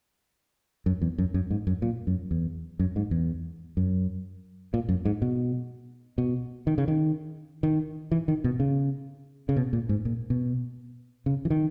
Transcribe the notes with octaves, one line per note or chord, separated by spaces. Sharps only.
F#2
E2
F#2
F#2
G#2
F#2
A#2
F#2
E2
F#2
G#2
E2
F#2
A#2
F#2
G#2
B2
B2
D#3
C#3
D#3
D#3
E3
D#3
B2
C#3
C#3
B2
A#2
G#2
A#2
B2
C#3
E3
D#3